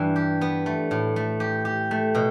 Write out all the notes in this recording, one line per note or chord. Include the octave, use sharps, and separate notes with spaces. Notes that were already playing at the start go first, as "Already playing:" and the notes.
Already playing: G2 E3 G3
G4
B3
A3
A2
A3
G4
G4
A3
B2